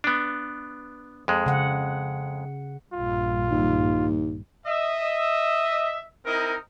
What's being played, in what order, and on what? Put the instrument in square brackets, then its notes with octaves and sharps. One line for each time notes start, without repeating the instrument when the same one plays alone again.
[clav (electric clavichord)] B3 D4
F2 G#3
[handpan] C#3 F#5
[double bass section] A#1 G2 [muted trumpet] F4
[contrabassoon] D#2
[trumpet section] D#5 E5
C4 D#4 E4 A#4 D#5